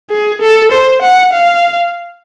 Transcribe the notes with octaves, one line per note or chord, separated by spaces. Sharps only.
G#4
A4
C5
F#5
F5